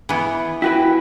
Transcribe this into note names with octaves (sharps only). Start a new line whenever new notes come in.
E3 B3
E4 F#4 B4 G5